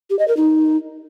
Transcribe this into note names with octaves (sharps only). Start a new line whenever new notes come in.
G4
D#5
A#4
D#4